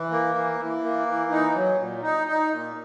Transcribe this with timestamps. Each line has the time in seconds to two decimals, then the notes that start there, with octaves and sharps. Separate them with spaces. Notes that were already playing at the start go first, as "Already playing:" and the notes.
Already playing: E3
0.11 A#3
0.35 E3
0.59 E3
0.83 A#3
1.07 E3
1.31 D#4
1.54 F#3
1.79 A#2
2.03 D#4
2.27 D#4
2.50 A#2